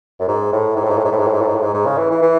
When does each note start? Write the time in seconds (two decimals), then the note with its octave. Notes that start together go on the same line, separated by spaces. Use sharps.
0.20 F#2
0.28 G#2
0.52 A2
0.76 G#2
0.84 A2
0.90 G#2
0.98 A2
1.05 G#2
1.12 A2
1.19 G#2
1.26 A2
1.34 G#2
1.41 A2
1.48 G#2
1.55 A2
1.63 G#2
1.74 G#2
1.86 C#3
1.98 E3
2.10 E3
2.22 E3